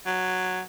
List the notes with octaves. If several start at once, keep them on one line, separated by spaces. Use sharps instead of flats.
F#3